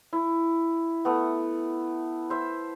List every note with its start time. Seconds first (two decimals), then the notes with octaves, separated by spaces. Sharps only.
0.13 E4
1.05 A3 B3
2.30 C5 E5